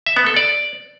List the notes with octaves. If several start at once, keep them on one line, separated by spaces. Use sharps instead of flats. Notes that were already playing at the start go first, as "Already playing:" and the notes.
E5
B3
A4
D5